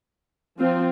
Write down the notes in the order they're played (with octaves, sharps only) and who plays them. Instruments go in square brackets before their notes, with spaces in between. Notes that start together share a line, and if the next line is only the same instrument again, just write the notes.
[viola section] F3 C4 F4